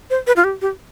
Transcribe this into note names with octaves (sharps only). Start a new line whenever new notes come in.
C5
B4
F4
G4
G4